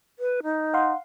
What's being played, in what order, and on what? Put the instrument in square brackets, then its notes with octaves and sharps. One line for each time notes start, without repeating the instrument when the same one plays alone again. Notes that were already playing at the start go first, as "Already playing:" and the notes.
[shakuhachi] B4
D#4
[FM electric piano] F5 F#5 C6